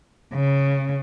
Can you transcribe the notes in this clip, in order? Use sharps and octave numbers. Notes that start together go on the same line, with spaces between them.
C#3